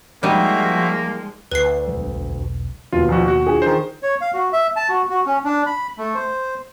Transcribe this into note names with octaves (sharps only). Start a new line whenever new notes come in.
F3 G3 G#3 A#3 D#4 F#4 C5 E5
D2 B4 C7
E1 B1
D#2 B2 F4
A#1 F3 F#4
F#4
D4 F4 G#4
D#3 C5
C#5
F5
F#4
E5
A5
F#4
F#4
C#4
D4
B5
A3
C5